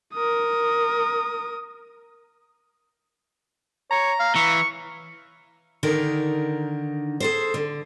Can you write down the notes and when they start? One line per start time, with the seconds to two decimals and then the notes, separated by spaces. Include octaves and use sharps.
0.14 A#4 D#6
3.91 C#5 A#5
4.20 F5
4.35 E3 C#6
5.83 D3 D#3 D#4 A#4
7.20 G#4 A4 C5
7.54 D3